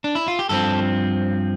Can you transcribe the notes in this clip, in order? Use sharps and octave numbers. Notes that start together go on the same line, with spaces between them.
D4
E4
F4
G4
G2 F3 C4 A4